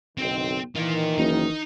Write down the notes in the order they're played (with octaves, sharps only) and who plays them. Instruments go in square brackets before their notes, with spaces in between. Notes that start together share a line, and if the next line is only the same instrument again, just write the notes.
[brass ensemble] F#1 B1 D#3 [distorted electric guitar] C4 G5
[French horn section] D#3 [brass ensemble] E3 [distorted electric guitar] F4 A#4
[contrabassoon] F#1 [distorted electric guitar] D#4